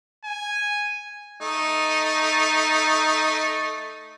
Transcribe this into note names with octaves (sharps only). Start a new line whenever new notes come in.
G#5
A3 D#4